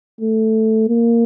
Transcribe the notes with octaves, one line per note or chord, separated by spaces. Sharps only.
A3
A#3